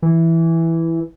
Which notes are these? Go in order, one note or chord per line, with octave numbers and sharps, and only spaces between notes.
E3